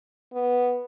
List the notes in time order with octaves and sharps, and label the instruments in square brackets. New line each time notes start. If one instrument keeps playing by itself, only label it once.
[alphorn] B3